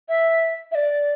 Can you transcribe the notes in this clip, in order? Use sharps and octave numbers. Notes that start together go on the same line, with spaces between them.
E5
E5
D5